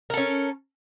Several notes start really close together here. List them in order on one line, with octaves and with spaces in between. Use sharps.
A#4 A4 C#4